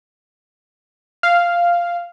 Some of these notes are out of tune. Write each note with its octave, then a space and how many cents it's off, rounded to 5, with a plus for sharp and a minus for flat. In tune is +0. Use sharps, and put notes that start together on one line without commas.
F5 -5